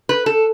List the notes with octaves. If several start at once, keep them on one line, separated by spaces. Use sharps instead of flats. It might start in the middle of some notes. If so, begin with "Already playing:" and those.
B4
A4